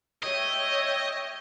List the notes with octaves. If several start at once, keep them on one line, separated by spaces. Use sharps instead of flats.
C#5 D#5 E5 G5